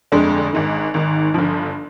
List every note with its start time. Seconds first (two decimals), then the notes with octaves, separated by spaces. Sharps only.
0.12 G1 F2 D3 G#3 D4
0.53 G#1 G#2 D#3
0.94 G#1 G#2 D#3
1.34 G1 G2 F3